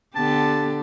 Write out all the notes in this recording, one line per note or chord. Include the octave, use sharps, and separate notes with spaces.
D3 B3 G4 A5